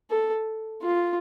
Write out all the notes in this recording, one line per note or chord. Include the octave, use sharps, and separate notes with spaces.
A4
F4